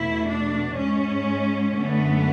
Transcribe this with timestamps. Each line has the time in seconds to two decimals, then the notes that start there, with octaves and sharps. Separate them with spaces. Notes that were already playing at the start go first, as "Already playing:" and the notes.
Already playing: E2 B2 A3 E4
0.28 D4
0.77 G#2 G#3 C#4
1.79 F#2 D3 A3 B3